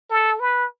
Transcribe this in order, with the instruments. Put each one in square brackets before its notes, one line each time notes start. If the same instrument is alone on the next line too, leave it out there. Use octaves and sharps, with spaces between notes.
[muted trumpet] A4
B4